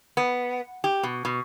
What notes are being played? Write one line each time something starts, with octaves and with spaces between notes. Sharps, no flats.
B3
G4
B2
B2